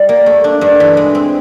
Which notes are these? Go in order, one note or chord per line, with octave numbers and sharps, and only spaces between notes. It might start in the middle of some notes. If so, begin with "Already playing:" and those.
Already playing: G3
A#3
A3
D4
G2
E3
G#3
C4